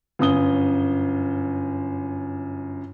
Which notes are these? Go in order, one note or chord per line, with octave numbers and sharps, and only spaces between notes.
G1 F#2 D#6 G7